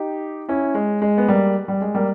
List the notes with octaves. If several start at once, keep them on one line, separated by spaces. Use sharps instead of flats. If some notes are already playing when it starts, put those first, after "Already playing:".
Already playing: D#4 G4
C#4 E4
G#3
G#3
B3
G3 A#3
G3
G#3
G3 A#3